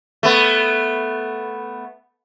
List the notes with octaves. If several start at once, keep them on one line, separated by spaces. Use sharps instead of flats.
A3 B3